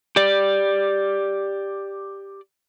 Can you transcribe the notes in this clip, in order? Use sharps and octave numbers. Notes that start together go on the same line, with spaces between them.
G4 D5